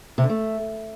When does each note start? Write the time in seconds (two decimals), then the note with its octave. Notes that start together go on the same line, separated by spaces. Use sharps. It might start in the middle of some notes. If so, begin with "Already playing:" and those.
0.18 C3
0.24 D3
0.29 A3